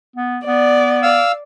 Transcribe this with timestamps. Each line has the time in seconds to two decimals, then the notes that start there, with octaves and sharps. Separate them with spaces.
0.16 B3
0.47 B3 D5
1.03 F5 E6